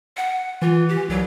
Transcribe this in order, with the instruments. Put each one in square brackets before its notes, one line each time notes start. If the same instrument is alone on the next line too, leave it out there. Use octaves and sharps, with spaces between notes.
[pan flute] F#5
[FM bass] E3 [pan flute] F4
[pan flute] G4
[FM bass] C2 [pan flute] F#3